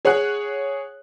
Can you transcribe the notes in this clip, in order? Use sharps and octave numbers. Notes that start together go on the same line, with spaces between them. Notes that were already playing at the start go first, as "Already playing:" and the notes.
G#4 C#5 F#5 G#5 F#6